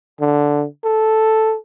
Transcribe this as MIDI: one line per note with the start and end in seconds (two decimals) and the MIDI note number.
0.21 0.66 50
0.84 1.56 69